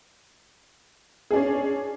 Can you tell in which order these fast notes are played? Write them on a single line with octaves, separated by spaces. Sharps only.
G#4 D4 C#4